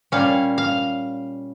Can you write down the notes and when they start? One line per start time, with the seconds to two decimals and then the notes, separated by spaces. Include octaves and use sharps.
0.12 A#2 G3 C#4 F5
0.58 F5